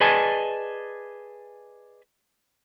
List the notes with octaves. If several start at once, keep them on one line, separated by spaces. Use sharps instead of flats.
G#4 B4 D5 D#5 G#5 A5